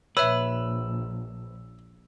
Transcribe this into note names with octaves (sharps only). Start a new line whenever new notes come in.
A#1 B4 C#5 E5 E6